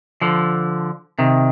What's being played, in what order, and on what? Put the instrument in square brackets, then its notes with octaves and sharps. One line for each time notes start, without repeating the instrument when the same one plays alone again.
[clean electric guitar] D3 F3
C3 D#3